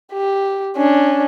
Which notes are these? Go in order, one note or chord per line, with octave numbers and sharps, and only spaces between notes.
G4
C#4 D4